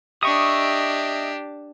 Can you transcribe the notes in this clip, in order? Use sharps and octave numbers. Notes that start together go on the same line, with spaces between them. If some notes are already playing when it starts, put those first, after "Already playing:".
D4 G4 D#5 E5 C#6 D#6